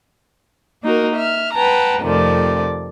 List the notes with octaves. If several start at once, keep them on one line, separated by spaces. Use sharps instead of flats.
A#3 D#4 F#4 A#4
E5 F6
B4 F#5 G5 A5 A#5
F2 C3 D#3 F3 A3 D5